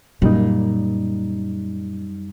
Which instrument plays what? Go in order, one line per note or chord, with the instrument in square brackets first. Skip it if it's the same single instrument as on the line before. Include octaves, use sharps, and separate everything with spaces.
[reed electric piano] F#2 G3 D#4 [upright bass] A#2